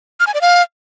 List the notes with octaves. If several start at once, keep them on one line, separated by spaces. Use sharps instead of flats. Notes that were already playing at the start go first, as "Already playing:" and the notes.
F6
G#5
D5
F5